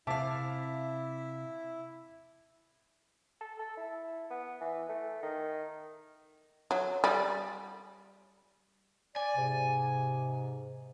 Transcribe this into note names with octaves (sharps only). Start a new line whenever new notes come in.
C3 E4 E5 F5 A5 D6
A4
A4
E4
B3
E3
A3
D#3
F#3
G3
D5 G#5
G#2 C3